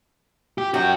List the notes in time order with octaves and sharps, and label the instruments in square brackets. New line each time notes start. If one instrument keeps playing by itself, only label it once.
[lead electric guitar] G4
[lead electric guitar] C#4 F#4 [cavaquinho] G5